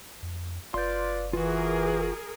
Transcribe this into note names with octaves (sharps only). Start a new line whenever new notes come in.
F2
F#1 F4 B4 D5 C6 G6
E3 F4 F#4 G#4 A#4